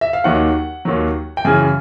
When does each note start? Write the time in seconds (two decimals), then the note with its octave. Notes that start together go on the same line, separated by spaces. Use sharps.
0.01 E5
0.13 F5
0.24 D#2 D#3 F#3 F#5
0.85 D#2 D#3 F#3
1.37 G5
1.45 F#2 C#3 E3 G#5